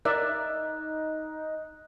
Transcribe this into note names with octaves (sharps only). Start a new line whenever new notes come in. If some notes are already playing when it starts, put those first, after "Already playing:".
D#4 A#4 D5 E5 F#6